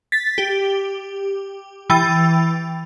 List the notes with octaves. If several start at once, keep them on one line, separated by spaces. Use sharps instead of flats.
A6 B6
G4
E3 G5 A6